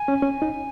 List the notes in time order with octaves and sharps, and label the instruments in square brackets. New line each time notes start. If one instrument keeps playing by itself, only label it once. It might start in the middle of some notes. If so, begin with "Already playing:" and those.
Already playing: [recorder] G#5
[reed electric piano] C#4
C#4
D#4